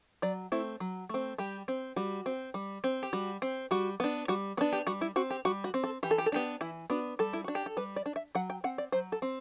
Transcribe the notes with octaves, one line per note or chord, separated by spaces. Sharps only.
F#3 D5
A3 C4 E4
F#3
A3 C4
G3 G4
C4
G3 F#4
C4
G3
C4
G4
G3 F#4
C4
G3 F#4
B3 D4
G3 F#4
B3 D4 B4
G4
G3 F#4
E4
C4 F#4
G4
G3 F#4
F#4
C4
A4
E3 G4
A4
G4
A4
B3 D4 G4
E3 E4
B3 D4 F#4
G3 A4
E4
D4 F#4
G4
A4
G3 B4
D5
D4
E5
F#3 F#5
G5
C4 F#5
D5
F#3 C5
A4
C4